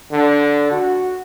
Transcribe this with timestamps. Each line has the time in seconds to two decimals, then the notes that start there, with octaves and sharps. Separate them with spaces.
0.12 D3
0.71 F#4